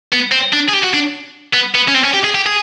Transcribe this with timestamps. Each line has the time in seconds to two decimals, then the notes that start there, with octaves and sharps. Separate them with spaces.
0.13 B3
0.32 C4
0.53 D4
0.68 G#4
0.73 G4
0.83 F#4
0.94 D4
1.53 B3
1.74 B3
1.88 C#4
1.94 C4
2.05 C#4
2.14 G4
2.24 G#4
2.35 G4
2.46 G#4